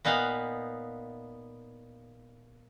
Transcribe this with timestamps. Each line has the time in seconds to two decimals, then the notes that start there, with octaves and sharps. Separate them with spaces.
0.05 A#2 B3 D#4 F5 F#5